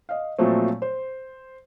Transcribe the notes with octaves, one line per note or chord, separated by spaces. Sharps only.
D#5 F5
A#2 F3 F#3 A3 C4
C5